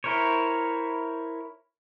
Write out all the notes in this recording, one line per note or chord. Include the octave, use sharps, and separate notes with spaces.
E4 A#4 C5 C#5